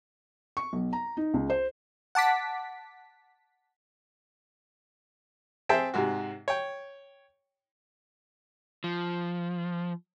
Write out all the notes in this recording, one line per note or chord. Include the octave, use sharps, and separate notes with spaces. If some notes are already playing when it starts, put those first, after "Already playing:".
C#6
B1
A#5
D#4
C#2
C5
F#5 A5 D6 B6
C4 G#4 C5 E5 G5 A5
G#2 C3 F#4
C#5 G5
F3